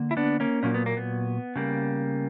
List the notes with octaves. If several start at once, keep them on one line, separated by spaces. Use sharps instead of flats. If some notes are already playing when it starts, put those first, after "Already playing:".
Already playing: D3 A#3
E4
B3 D4
A#3 C#4
A#2 F#3 A#3 C#4
B3
A#3
B3
C#3 G3 A#3